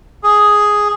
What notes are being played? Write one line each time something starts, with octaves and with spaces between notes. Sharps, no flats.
G#4